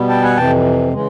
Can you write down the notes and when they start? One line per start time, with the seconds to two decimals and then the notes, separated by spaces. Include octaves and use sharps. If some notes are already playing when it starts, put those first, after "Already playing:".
Already playing: B2 G3 B3
0.09 G5 A5
0.23 F#5 G#5
0.37 F2 C3 E3 G5 A5
0.93 C#3 E3 G#3